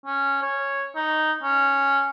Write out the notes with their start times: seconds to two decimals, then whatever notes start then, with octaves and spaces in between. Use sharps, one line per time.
0.06 C#4
0.42 C#5
0.95 D#4
1.43 C#4